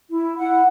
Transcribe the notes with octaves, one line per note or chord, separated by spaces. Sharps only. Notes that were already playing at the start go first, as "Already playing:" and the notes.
E4
E4 F#5